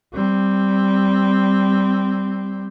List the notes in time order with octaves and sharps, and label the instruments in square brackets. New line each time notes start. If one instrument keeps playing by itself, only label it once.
[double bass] G3 C4